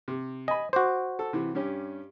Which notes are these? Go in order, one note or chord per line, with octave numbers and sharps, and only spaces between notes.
C3
D#5 G#5 B5
F#4 C5 D6
A4
C3 E3
G2 C#4 G4